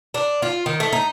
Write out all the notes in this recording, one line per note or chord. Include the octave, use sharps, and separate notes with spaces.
D4
F4
D#3
A3
D#4